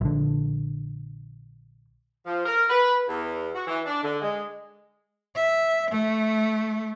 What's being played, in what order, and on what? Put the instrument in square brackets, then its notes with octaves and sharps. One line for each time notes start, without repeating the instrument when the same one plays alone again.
[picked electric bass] A#1 D3
[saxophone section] F3
A#4
B4
E2
F#4
E3
D4
D3
G#3
[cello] E5
A3